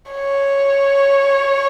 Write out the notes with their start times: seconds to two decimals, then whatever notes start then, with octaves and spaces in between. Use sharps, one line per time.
0.11 C#5